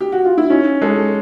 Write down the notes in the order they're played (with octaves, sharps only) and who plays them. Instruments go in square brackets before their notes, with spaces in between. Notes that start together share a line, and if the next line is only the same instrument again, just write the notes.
[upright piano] G4
F#4
F4
E4
[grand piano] C#4 [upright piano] D#4
[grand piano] G#3 [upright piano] A4